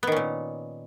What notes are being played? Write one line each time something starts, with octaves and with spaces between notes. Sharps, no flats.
A#2 D#3 B3 C#4